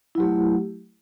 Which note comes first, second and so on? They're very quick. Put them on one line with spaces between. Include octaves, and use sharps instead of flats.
E4 F#3 G4 A3